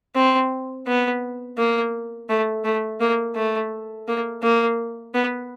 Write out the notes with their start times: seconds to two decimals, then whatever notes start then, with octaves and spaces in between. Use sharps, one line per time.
0.15 C4
0.87 B3
1.58 A#3
2.29 A3
2.64 A3
3.00 A#3
3.36 A3
4.08 A#3
4.43 A#3
5.14 B3